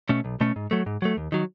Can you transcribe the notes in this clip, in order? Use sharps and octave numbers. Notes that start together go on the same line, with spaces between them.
B2 A3 C#4
B1
B2 A3 C#4
G#2
F#3 A3
G#2
F#3 A3
D#2
D#3 F#3